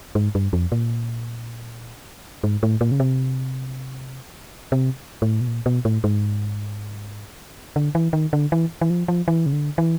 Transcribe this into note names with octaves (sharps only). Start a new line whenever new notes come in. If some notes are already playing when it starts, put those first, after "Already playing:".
G#2
G2
F2
A#2
G#2
A2
A#2
C#3
C3
C3
A2
B2
A#2
B2
A2
G#2
D3
E3
D#3
D3
E3
E3
F3
F3
E3
C#3
D3
E3